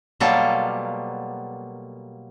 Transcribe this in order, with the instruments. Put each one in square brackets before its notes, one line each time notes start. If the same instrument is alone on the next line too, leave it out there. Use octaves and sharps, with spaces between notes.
[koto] B2 F#3 G3 A#3 F4 A4